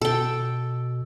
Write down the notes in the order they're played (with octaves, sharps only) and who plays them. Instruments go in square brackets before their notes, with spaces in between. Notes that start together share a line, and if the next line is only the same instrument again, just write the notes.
[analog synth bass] B2 [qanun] A4 G5